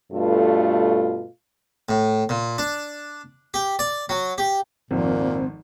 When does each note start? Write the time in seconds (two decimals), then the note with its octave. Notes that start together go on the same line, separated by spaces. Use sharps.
0.13 G2 B2 A3 F4 A4
1.89 A2
2.29 A#2
2.58 D4
3.54 G4
3.79 D5
4.09 F#3
4.38 G4
4.91 G#1 F2 A#2 C4